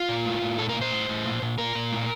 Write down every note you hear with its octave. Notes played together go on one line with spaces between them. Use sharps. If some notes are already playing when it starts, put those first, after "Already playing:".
Already playing: F4
A#2
A2
A2
A#2 A4
A#4
A#2
C5
A2
A2
A#2
A#2
A#2 A#4
A#2
A2